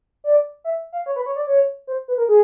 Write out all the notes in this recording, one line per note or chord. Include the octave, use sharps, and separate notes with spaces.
D5
E5
F5
C#5
B4
C#5
D5
C#5
C5
B4
A#4
G#4